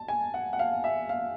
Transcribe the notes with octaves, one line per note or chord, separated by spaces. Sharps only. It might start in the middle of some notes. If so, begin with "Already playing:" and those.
Already playing: A5
G#5
F#5
F#5
F5
E5
F5